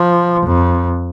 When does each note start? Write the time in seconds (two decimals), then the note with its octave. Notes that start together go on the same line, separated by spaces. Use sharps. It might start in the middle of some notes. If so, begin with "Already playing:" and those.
Already playing: F3
0.46 F2